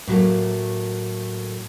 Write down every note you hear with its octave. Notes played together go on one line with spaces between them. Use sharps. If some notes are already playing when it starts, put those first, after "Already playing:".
A2 F#3 A3 A#3